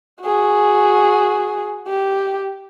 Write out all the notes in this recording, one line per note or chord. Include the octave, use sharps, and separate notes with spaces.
F#4 G#4
G4